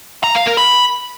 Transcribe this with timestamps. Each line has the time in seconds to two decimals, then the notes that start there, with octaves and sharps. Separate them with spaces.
0.24 A#5
0.35 F5
0.46 A#4
0.57 B5